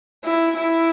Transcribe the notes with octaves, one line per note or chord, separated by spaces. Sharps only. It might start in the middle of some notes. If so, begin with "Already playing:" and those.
E4
E4